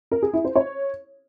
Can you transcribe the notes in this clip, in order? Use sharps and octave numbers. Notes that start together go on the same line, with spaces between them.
A#4
G#4
E4
C5
C#5